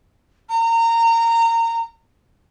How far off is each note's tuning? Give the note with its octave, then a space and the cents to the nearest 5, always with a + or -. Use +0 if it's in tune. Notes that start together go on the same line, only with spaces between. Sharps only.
A#5 -25